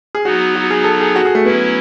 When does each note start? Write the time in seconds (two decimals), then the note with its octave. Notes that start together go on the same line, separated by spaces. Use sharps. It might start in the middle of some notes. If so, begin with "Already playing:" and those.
0.15 G#4
0.25 F#3 B3 D#4 F#4
0.55 F#4
0.70 G#4
0.84 A4
1.00 G#4
1.16 F#4
1.25 G#4
1.35 A3
1.45 F#3 B3 C#4 E4